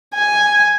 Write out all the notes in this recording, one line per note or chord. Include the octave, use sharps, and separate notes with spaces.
G#5